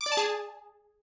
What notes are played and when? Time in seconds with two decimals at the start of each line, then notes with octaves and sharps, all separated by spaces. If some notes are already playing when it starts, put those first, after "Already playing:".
0.01 D6
0.06 D5
0.12 A5
0.17 G#4